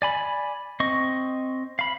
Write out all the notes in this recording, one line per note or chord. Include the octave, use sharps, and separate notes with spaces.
D5 G#5 B5
C4 D#5 C#6
F5 B5